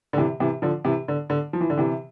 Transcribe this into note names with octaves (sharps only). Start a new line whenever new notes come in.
D3
C3 E3
C3 E3
D3 F3
C3 E3
D3
D3
F3
E3
D3
C3 E3